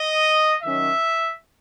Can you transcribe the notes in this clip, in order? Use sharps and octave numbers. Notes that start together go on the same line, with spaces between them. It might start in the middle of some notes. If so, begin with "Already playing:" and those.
Already playing: D#5
D#3 F#3 C#4 E5